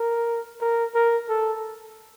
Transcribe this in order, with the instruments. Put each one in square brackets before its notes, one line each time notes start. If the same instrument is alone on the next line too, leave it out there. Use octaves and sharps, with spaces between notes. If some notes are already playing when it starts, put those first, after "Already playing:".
Already playing: [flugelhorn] A#4
A#4
A#4
A4